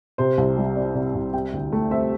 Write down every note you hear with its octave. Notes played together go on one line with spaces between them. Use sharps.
C3 C5
C2
G3
C4 D5
C3 D5
E5
C2
C3 G5
D2
A3
C4 E5